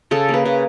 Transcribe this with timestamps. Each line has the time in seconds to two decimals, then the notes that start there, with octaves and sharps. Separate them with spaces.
0.11 C#3 A4
0.29 A#3 B4
0.45 C#3